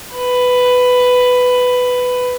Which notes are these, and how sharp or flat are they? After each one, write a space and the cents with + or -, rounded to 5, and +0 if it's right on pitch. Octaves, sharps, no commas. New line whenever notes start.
B4 +10